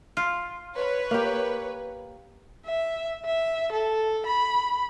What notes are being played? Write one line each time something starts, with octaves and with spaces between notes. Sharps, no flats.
F4
B4 C#5
A#3 G4
E5
E5
A4
B5